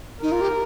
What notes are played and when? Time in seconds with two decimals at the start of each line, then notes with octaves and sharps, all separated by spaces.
0.22 D#4 A#4
0.32 F4
0.41 G4